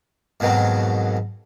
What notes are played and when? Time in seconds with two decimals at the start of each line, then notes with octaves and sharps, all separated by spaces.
0.40 F2 G#2 B2 D#3 F#3